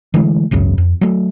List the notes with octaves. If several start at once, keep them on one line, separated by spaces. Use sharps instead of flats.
D3 E3 G#3 A3
G#1 C#2 F#2 C#3
F2
F#3 A3